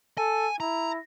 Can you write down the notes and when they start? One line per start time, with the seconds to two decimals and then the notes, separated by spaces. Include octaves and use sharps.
0.18 A4 G#5
0.60 E4 A#5